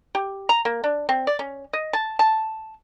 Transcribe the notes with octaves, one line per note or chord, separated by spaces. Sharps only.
G4
A#5
A#3
D4
C4
D5
C#4
D#5
A5
A5